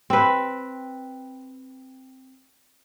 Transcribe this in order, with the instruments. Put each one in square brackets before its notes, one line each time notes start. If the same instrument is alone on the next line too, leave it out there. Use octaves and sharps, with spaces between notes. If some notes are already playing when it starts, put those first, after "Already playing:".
[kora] C4 B4